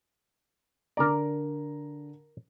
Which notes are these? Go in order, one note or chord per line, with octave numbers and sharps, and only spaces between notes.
D3 A#4 D5 A#5